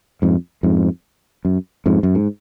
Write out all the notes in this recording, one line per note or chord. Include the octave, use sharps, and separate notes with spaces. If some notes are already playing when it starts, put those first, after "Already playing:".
F2 G#2
F2 G#2
F#2
F2 G#2
F#2
G#2